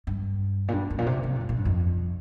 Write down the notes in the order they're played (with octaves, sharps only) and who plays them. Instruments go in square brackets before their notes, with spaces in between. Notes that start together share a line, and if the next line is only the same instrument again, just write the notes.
[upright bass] G2
A#2
G2
G2
A#2
C3
C3
A#2
G2
A#2
G2
F2